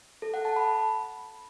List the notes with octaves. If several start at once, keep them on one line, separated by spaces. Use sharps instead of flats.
A4
F#5
A5
B5